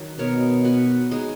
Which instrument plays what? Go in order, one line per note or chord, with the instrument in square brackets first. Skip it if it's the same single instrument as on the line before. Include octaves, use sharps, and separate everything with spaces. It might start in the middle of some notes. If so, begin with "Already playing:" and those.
Already playing: [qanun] D#3 F#3
[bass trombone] B2 [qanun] B3 D#4 A#4 C#5
[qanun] B3 F#4 B4
G#3 D#4 G#4 D#5